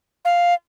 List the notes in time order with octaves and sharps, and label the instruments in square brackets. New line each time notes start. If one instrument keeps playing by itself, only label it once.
[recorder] F5